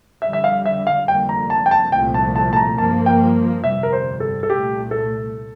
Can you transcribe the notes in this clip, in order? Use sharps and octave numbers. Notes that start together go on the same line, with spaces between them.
F2 D3 G3 E5
E5
F5
E5
F5
F1 F2 D3 G3 A#3 G5
A#5
A5
G5
A5
C2 A#2 F3 A3 C4 G5
A5
A5
A5
A#5
G2 F3 A#3 A5
G5
G1 F2 C3 G3 E5
A#4
C5
A4
A4
C2 A#2 A3 G4
A4